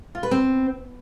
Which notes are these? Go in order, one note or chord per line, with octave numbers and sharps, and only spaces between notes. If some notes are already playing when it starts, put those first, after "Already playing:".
F4
B4
C4